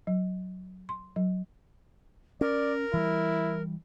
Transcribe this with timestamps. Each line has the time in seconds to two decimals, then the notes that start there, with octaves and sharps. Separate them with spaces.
0.07 F#3
0.89 C6
1.16 F#3
2.41 C#4 A#4 D5
2.93 E3 G3 E4